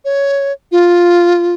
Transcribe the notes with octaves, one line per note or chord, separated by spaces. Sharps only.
C#5
F4